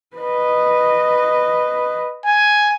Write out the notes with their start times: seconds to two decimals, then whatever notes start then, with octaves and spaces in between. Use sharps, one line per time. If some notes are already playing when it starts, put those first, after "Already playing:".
0.16 B4 D#5
2.26 G#5